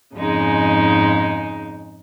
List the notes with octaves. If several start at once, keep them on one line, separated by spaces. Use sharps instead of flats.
F2 G#2 C#3 G#3 D#4